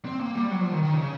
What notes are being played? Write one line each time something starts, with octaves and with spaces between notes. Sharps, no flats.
C4
A#3
G3
F#3
F3
D#3
D#3
C#3